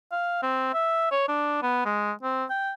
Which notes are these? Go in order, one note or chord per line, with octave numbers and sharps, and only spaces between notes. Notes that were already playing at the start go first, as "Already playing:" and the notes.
F5
C4
E5
C#5
D4
B3
G#3
C4
G5